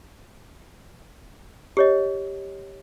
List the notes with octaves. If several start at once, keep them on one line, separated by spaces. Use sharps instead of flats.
G4 C#5 D#5